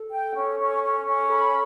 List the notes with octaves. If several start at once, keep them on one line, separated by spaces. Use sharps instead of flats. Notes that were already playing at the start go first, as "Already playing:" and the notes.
Already playing: A4
G5
C#4
C#4
C#4
C#4
A4 B5